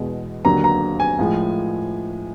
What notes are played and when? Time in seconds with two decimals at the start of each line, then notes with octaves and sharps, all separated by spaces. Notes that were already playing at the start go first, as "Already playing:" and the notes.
Already playing: E2 B2 G#3
0.45 D#2 D3 F#3 A#5
0.64 A#5
1.00 G#5
1.19 A2 F3 G#3